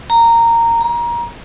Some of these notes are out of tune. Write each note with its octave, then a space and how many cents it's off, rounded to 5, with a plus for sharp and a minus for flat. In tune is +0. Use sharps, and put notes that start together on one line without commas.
A#5 -10
A#5 +25